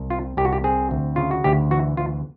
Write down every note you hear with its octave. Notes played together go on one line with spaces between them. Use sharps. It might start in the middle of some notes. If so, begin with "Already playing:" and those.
Already playing: C2
C4 F4
C2 G4
F#4
G4
C4 G#4
D2
C#3 F4
F#4
D2 G4
E3 F#4
D2 F4